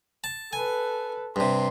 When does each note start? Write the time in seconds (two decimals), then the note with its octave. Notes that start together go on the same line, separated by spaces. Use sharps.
0.24 A5
0.53 A4 B4 G#5
1.36 G2 C3 C6